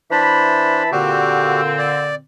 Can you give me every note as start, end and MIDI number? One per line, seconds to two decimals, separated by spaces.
0.11 0.86 52
0.11 0.83 62
0.11 0.83 72
0.11 0.86 81
0.11 0.86 83
0.92 2.20 46
0.92 2.20 50
0.92 2.20 60
0.92 1.61 66
0.92 1.61 67
1.78 2.15 74